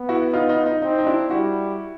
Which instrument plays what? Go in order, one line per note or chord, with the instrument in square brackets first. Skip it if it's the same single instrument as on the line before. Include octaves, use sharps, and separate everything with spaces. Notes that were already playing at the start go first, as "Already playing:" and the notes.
Already playing: [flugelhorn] B3
[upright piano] E4 F#4
D#4 F4
D#4 F4
D#4
[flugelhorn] C4 [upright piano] D#4
[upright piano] D#4
D4 E4
[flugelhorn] G3 [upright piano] E4 F#4